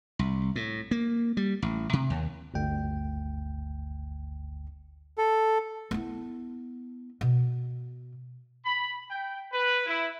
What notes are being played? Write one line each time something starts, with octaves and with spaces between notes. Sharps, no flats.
C2
A2
A#3
G3
A1
C3
D#2
G1 D2 G5
A4
B3 E4
B2
B5
G5
B4
E4